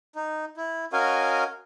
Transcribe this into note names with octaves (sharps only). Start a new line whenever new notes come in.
D#4
E4
C#4 F#4 A#4 D#5 F5 G#5